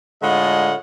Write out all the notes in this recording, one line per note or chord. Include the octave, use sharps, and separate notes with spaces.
A2 D3 G#3 F4 D#5 F#5